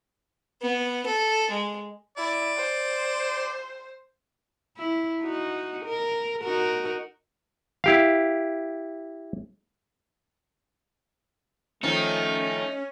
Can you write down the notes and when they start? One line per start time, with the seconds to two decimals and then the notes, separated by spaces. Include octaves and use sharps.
0.62 B3
1.06 A4
1.50 G#3
2.18 E4 D5
2.57 C5
4.78 E4
5.22 D#4 F#4
5.86 A#4
6.43 D#4 F#4 A#4
7.84 E4 G4 F5
11.83 D#3 F3 A3 C#4 D#4